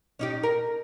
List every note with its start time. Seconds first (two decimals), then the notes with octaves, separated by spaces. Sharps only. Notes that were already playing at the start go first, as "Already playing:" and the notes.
0.19 C#4 D#4 G4
0.43 A#4